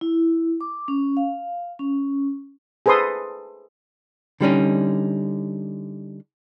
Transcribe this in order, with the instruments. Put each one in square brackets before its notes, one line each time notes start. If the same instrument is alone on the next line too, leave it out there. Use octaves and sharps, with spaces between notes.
[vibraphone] E4
D6
C#4
F5
C#4
[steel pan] G#4 A4 B4 C5 C6 D#6
[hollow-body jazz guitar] D3 G3 C#4 D#4